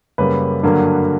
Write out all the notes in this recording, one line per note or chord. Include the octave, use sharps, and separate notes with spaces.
F#2 C#3 G3 A#3 B4
G2 D3 F#3 A#3